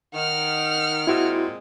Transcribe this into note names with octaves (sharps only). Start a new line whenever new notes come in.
D#3 F#5 F6
A#2 G#3 C4 E4 F#4